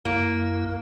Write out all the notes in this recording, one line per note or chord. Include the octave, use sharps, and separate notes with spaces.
F#2 A#3 E4